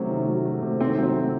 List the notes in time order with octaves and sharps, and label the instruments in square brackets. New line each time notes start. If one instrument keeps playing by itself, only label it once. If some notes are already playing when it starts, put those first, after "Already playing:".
Already playing: [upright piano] C3 D#3 F#3 A3 [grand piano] C#4
[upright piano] D#3
F#3
A3
C3
[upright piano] D#3 [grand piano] C4
[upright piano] F#3 [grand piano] C4
[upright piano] A3